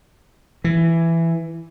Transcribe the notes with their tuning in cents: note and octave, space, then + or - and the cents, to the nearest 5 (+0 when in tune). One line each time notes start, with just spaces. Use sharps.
E3 +10